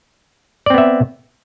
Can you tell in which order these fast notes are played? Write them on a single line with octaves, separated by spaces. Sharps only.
D5 C4 B3 E5